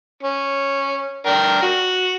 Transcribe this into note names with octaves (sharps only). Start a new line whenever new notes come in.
C#4
D4 A#4 G5
F#4